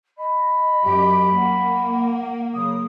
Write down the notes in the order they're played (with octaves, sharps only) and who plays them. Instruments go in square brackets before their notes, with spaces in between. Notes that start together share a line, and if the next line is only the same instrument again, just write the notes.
[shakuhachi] D#5 [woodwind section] B5
[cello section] F#2 G4
[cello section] A#3 [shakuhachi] F#5
[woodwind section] C#3 F#3 [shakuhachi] D#6